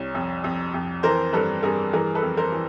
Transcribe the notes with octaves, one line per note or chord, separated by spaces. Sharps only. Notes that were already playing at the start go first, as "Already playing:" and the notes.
Already playing: C2 C#5
F2
F2
F2
E3 A#4 C5
G2 A4 B4
G2 G#4 A#4
E3 G#4 A#4
A4 B4
F2
A#4 C5
E3